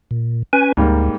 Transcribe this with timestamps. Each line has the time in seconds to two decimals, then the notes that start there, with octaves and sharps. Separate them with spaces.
0.11 A#2
0.53 C#4 B4 G#5
0.77 D2 G#2 G3 A#3